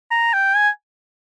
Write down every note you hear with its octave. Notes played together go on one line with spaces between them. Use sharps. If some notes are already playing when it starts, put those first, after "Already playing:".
A#5
G5
G#5